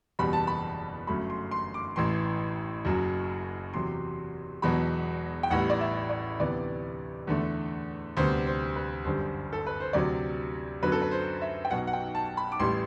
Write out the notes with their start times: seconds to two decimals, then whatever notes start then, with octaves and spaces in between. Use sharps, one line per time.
0.19 F#1 E2 B2 G3 B5
0.33 A5
0.47 B5
1.07 G1 F#2 F#3 A3 B5
1.30 C6
1.51 C6
1.74 D6
1.96 A1 A2 E3 C6
2.85 F#1 F#2 F#3
3.73 E2 C3 F#3 C6
4.62 E1 E2 B2 F#3 B5
5.43 G5
5.50 A1 A2 G3 B3 F#5
5.70 D5
5.81 E5
6.09 D5
6.39 D2 C3 E3 B3 D5
7.27 E2 D3 A3
8.17 D2 C3 G3 B3 C5
8.46 C5
8.76 B4
9.05 G1 F#2 D3 G3 C5
9.53 A4
9.66 B4
9.80 C5
9.93 D2 C3 F#3 D5
10.82 F#2 D3 F#3 B3 B4
10.92 A4
11.02 B4
11.11 C5
11.42 E5
11.65 G5
11.70 B1 B2 F#3 F#5
11.87 F#5
11.93 G5
12.15 A5
12.37 B5
12.52 D6
12.59 A1 A2 E3 G3 C6